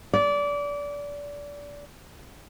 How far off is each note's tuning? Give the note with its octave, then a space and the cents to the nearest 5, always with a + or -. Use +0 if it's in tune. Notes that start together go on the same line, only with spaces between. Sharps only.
D5 -25